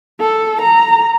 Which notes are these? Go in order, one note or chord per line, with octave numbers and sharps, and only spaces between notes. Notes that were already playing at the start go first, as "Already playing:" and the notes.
A4
A#5